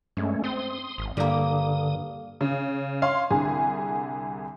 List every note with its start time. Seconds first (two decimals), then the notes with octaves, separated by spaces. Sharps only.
0.17 G2 G#3 A3 C#4
0.44 C4 C6 D#6
0.98 G#1
1.17 G2 D3 G3 A#3 D#6
2.41 C#3
3.02 C#5 F5 C6
3.30 C2 D3 G#4